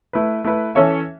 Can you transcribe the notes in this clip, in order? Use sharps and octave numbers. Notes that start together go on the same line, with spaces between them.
A3 E4 B4
A3 E4 B4
E3 C#4 A4 C#5 E5